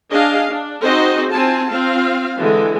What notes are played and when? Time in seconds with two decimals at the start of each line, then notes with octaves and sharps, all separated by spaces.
0.11 D4 G#4 D#5 F5
0.50 D4
0.83 C4 D#4 F#4 G#4 C5 D#5
1.31 C4 F4 G#5 A5
1.69 C4 F4 F5
2.40 D3 E3 G#3